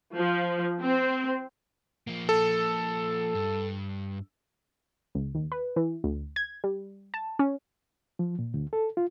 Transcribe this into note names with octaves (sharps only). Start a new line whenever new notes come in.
F3
C4
F3 A#3
A4
G2
C#2
D#2
B4
E3
D2
G#6
G3
A5
C#4
F3
A#2
D2
A4
F4